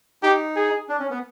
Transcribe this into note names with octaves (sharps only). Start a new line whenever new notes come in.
D#4 G4
G#4
D4
C#4
B3